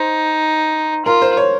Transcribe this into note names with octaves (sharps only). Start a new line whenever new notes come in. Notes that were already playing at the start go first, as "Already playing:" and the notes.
Already playing: D#4 C5
F4 A#4
C5
C#5